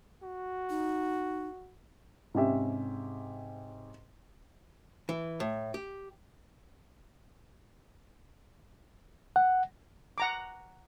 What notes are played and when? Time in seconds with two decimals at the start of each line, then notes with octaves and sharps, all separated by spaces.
0.23 F#4
0.70 D#4
2.34 G#2 C3 C#4 G4 E5
5.09 E3
5.40 A2
5.74 G4
9.36 F#5
10.18 F#5 A#5 D6